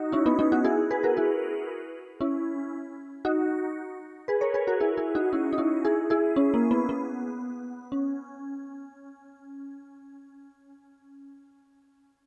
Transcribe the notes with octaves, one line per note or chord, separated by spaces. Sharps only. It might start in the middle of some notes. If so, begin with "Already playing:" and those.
Already playing: D#4 F#4
C#4 E4
B3 D#4
B3 D#4
D#4 F#4
E4 G#4
G#4 B4
F#4 A#4
E4 G#4
C#4 E4
D#4 F#4
G#4 B4
A#4 C#5
G#4 B4
F#4 A#4
E4 G#4
E4 G#4
D#4 F#4
C#4 E4
D#4
C#4 E4
E4 G#4
E4 G#4
C#4
A#3
B3
B3
C#4